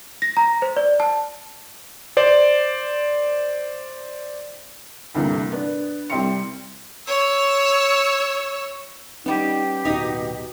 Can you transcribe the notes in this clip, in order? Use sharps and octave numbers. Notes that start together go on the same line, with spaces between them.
A#6
A#5
C5
D5
A5
C5 D5
D2 G2 C3 E3 A3 A#3
B3 D4
C2 G3 C4 E5 C6 C#7
C#5 E6
G3 B3 C#4 D#4 G4
D1 B2 D#4 D#5